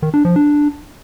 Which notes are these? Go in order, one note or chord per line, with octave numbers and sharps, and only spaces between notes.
D#3
D4
F3
D4